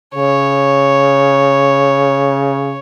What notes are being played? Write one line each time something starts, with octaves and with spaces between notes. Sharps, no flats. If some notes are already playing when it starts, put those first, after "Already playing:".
C#3 C#5